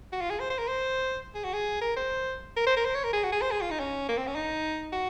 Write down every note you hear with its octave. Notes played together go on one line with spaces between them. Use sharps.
F#4
F4
G#4
C5
C5
A#4
C5
G#4
F#4
G#4
A#4
C5
A#4
C5
A#4
C5
C#5
A#4
G#4
F#4
G#4
C5
G#4
F4
D#4
C#4
A#3
C4
C#4
D#4
F#4